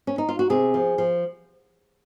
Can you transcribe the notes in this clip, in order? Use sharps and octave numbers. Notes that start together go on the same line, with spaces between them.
C#4
D#4
F4
F#4
C3 G#4
F3
F3